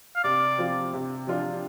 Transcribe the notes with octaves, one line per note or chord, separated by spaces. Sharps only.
F5
C3 D5
F3 C4 F4
C3
F3 D4 F4